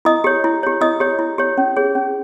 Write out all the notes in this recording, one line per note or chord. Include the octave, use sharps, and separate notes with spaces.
E4 D#5 D#6
G4 C#5
E4
G4 C#5
E4 D#5 D#6
G4 C#5
E4
G4 C#5
C#4
G#4 C#5
C#4